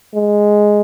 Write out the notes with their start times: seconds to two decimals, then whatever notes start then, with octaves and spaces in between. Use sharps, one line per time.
0.14 G#3